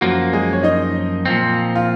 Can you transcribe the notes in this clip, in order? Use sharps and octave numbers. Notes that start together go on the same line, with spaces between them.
F#2 F3 A#3 F#4
G#3 G#4
C#5
D#4 D#5
A#2 F3 C4
F4